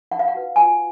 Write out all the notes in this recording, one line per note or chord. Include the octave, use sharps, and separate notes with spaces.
D#4 F#5
F5
F#5
F#4 B4
F4 G#5